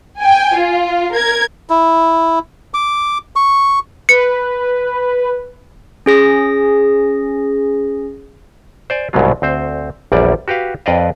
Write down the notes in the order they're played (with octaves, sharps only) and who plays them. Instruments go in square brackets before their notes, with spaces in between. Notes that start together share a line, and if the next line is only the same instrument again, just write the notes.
[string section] G5 G#5
F4
A#4 G#6
[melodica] E4
D6
C#6
[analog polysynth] B4 [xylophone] C#7
[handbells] C#4 G#4 A#6
[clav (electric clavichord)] C5 D5 G#5
C2 G#2 B2 F#3 F4
D2 C4 C5
A#1 E2 G3 D5
F#4 G4 B4 F5
F2 B4 D5 D#5 F5